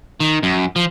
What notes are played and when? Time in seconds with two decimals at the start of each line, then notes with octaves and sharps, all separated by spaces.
0.20 D#3
0.43 F#2
0.76 F3